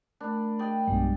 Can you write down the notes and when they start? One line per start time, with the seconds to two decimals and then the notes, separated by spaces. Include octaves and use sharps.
0.21 A3 D4 A#4 B5
0.59 D5 D#5 G5
0.87 B1 G2 G#3 B3 D4